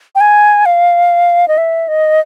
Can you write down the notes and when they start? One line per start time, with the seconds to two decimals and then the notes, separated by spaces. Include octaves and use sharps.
0.15 G5
0.21 G#5
0.66 F5
1.48 D#5
1.58 E5
1.88 D#5